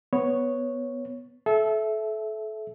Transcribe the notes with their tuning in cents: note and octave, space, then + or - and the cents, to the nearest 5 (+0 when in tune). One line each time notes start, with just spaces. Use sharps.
B3 +0 C#5 +0
A4 -30 E5 +0